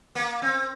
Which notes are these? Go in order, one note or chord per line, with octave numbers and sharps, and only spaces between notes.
A#3
C4